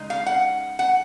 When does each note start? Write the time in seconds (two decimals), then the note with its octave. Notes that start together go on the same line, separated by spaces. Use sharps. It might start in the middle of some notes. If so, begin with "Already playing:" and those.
Already playing: C#3 G#3 D#4
0.10 F5
0.26 F#5
0.79 F#5